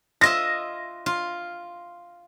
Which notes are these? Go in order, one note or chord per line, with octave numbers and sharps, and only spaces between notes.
F4 D#5 E5 A#6
F4